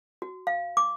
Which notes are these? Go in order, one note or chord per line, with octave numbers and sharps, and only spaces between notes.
F#4
F5
D6